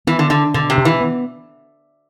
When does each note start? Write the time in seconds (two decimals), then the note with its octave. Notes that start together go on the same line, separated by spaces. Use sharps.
0.07 E3 B3
0.19 D3
0.30 D3 D4
0.54 B2 D3
0.70 C3
0.77 B2
0.85 E3
1.01 B3